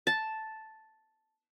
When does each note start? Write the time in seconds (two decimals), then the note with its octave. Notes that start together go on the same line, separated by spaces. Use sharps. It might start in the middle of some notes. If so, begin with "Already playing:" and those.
0.07 A5